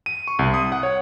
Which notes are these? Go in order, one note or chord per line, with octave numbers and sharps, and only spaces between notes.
D#7
C#6
C2
D#6
F#5
C#5